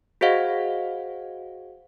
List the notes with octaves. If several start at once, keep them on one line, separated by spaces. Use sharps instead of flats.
F#4 G#4 C5 D#5 F5 F#5